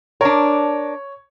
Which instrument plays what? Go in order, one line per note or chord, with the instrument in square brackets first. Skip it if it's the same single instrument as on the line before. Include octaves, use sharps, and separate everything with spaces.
[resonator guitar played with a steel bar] D4 A#4 [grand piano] C#5